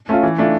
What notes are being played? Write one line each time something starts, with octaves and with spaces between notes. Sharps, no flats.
A3 C#4 F4
E3
A3 D4 F4